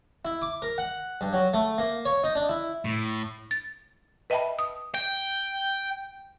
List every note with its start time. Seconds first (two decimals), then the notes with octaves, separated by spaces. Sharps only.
0.25 E4
0.42 D6
0.62 A#4
0.78 F#5
1.21 G2
1.33 F#3
1.53 A3
1.78 A#3
2.05 C#5
2.24 D#4
2.35 D4
2.49 E4
2.85 A2
3.51 A6
4.30 B4 D#5 E5 G5 A5 B5
4.59 D#6
4.94 G5